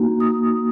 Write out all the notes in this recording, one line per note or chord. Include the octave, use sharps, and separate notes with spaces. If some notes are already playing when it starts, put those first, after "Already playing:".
Already playing: A#3 D#4 F#4
D#6